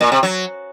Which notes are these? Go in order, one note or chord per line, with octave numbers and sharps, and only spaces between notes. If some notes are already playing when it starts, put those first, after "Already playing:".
A#2
C3
F#3